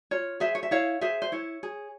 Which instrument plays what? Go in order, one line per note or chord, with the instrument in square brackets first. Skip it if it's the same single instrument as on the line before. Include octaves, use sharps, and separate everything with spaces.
[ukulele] F4 C#5
G#4 C5 E5
C#5
E5
E4 C#5 F5
G#4 C5 E5
C5
E4 C#5
G#4